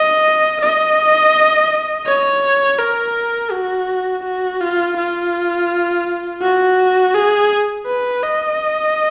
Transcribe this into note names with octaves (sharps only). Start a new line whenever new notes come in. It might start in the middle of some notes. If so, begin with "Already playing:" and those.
Already playing: D#5
D#5
C#5
A#4
F#4
F#4
F4
F4
F#4
G#4
B4
D#5